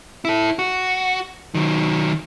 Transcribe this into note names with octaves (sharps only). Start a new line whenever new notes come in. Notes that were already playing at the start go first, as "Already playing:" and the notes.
E4 A4
F#4
D#3 F#3